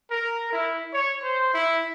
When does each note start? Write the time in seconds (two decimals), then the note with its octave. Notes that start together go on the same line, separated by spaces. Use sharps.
0.10 A#4
0.52 E4
0.93 C#5
1.23 C5
1.54 E4